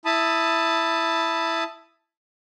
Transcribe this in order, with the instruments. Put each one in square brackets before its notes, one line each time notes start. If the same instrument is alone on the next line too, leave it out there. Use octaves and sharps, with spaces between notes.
[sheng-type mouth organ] E4 A5 B5 D#6